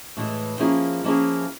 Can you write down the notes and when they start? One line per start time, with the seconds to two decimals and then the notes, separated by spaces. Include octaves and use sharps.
0.17 A2 E3 G#3
0.59 F3 A#3 C#4 E4 G#4
1.04 F3 A#3 C#4 E4 G#4